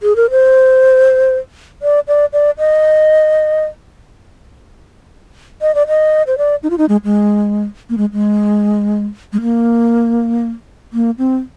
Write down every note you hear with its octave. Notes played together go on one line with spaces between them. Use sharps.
G#4
A#4
C5
D5
D5
D5
D#5
D#5
D5
D#5
C5
D5
D#4
F4
D#4
G#3
G#3
A#3
G#3
G#3
G#3
A#3
A#3
C4